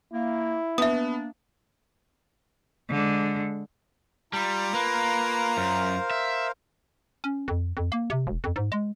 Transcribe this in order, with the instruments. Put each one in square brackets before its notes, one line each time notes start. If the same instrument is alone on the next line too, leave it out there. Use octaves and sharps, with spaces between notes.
[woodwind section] A#3 [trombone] E4
[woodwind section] A#3 D4 [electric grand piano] B3 [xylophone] E5 D#6
[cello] D3 G#3
[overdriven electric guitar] G3 [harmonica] F4 A#5
[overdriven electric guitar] A#3 [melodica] B4
[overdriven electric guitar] F#2 [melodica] A#4 C5 F5
[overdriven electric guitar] E5
[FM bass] C#4
F2
F2
A#3
C3
E1
F2
G#2
G#3